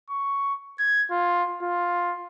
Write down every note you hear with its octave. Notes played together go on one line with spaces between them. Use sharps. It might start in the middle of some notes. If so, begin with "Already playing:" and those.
C#6
G#6
F4
F4